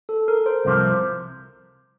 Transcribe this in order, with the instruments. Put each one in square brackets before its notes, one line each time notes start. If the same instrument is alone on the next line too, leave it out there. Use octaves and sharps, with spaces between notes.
[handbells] A4
A#4
C5
[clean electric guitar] C2 C3 F3